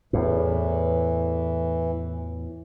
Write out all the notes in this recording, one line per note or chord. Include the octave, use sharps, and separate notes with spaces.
E2 A2 E3